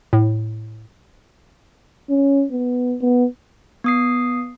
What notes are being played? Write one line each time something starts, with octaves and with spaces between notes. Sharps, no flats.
A2
C#4
B3
B3
B3 D#6 C7